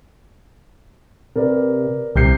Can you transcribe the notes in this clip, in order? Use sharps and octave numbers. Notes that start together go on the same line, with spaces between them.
C3 A#4 B4 D5
C2 C3 G6 C7